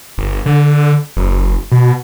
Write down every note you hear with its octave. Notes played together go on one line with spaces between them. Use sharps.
G1
D3
F#1
B2